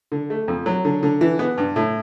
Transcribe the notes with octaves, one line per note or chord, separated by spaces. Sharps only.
D3
A3
F2
F#3
D3
D3
E3
B3
G2
A2